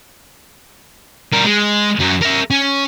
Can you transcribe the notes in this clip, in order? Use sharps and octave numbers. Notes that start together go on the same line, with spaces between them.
G3 A#4
G#3
F#2 F#3
A#4 E5
C#4